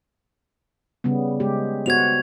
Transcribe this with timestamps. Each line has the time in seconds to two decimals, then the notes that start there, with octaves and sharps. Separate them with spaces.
1.04 C#3 G3 B3
1.40 G#3 G4
1.86 B3 F#4 C5 G#6 F7